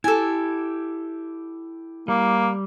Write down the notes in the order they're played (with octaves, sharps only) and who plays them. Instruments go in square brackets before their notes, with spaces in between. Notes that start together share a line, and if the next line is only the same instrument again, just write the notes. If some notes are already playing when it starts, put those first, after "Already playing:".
[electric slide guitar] E4 G4 [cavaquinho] A4 G#5
[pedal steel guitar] G3 [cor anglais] A#3